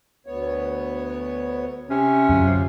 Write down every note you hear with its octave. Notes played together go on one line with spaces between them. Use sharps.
D2 B3 C#5
C3 C#4
F#2 D3 F#3 F4